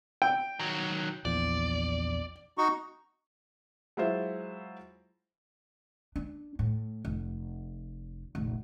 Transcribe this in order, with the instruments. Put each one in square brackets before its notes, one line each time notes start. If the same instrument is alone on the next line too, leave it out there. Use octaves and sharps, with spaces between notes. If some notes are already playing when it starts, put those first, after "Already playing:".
[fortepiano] G5
[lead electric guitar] D#3 F#3
[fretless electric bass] A#1 E2 F3 [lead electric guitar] D5
[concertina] D#4 F#4 C#6
[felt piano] F#3 G#3 E4 F4 C5 E5
[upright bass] D4
A2
F1
F1 A#1